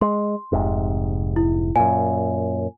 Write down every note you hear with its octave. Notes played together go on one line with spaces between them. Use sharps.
G#3 C6
F1 G#2 C3
E4
F#2 A#2 G#5